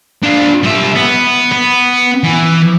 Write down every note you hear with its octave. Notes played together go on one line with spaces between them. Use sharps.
D4 F4
G3 E5
B3
B3
E3